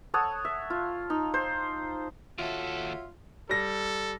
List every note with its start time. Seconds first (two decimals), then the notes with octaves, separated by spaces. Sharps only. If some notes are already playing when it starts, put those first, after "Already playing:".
0.14 A4 C#5 F#5 D#6
0.45 E5
0.70 F4
1.10 D#4
1.34 C5
2.38 D#2 F4 F#4 A4 C#5 E5
3.49 G3 A4 A#6